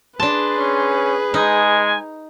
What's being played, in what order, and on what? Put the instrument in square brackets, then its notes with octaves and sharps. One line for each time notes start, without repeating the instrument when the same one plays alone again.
[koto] D4 A5 [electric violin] G#4 B4 [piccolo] C6
[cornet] C#4
[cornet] G#3 [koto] D#4 [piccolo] G#5